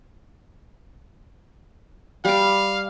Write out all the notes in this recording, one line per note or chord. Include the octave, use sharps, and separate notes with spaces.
G3 F5 D6